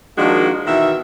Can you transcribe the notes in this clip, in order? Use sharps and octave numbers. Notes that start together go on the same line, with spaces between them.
D#3 F3 G#3 A#3 D4 F#4
B2 D#3 E3 E5